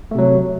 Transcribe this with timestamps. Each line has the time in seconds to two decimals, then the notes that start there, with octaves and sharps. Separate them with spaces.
0.11 A3
0.15 C3
0.18 F#3